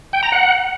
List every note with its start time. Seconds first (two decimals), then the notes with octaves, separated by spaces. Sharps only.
0.13 G5
0.23 A#5
0.32 F#5